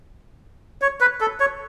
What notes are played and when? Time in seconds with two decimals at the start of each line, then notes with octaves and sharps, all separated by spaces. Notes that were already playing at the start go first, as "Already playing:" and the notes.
0.82 C#5
1.01 B4
1.21 A4
1.40 C#5